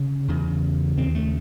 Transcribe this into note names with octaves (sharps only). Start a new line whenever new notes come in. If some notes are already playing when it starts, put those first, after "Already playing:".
Already playing: C#3 C#4
E2 C#3
D#2 C#3 C4
A3